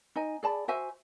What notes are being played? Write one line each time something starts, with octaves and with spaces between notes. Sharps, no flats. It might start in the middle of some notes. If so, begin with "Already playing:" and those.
D#4 D#5 G#5
G#4 D5 A5 B5
F#4 C5 E5 G#5